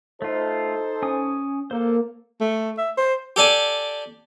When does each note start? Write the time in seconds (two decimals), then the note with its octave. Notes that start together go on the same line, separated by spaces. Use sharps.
0.22 A3 D#4 F4 A4 C5
1.02 C#4 G#5 D#6
1.71 A#3 A4 C5
2.41 A3
2.78 E5
2.97 C5
3.36 G4 A4 D5 G#5